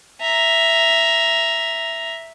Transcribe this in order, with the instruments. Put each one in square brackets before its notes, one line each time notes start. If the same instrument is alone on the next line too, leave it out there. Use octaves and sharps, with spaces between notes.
[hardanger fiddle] E5 A#5